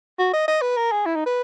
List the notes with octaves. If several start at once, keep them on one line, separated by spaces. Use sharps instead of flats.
F#4
D#5
D#5
B4
A#4
G#4
E4
D#4
B4